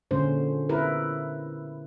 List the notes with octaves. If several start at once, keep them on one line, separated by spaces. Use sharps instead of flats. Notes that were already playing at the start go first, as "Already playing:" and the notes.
A#2 D3 G#3 C#4 C5
E4 A#4 B4